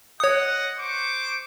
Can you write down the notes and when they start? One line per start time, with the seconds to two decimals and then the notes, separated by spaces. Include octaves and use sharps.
0.20 C#5 D#5 F#5 D#6
0.78 C5 C#6 D6